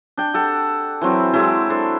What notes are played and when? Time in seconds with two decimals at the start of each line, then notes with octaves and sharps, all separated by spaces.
0.17 D4 G5
0.34 G4 A4 F#5
1.01 E3 F#3 C4 E4
1.34 F#3 G#3 E4
1.70 D4 A4 C5